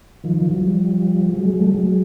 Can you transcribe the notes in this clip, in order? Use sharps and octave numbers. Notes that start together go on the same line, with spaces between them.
D#3 F3
D#3 F3
E3 F#3
F3 G3
F#3 G#3
F#3 G#3
G3 A3
F#3 G#3